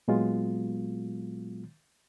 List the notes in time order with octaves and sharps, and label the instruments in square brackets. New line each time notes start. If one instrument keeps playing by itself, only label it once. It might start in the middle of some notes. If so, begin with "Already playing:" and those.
[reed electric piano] A#2 F#3 G#3 B3 F4